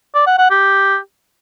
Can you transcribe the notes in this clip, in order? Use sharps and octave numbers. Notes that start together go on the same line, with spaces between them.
D5
F#5
F#5
G4